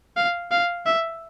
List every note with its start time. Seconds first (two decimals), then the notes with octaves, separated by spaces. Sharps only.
0.17 F5
0.51 F5
0.86 E5